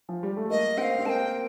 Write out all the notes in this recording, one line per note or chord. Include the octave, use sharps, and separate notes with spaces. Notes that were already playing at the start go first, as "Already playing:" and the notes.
F3
G3
A3
A#3 D#5
C4 F5 G5
C4
A#3 G5 A5